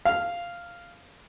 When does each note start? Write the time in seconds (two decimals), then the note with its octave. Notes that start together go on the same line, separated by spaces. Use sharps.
0.05 F5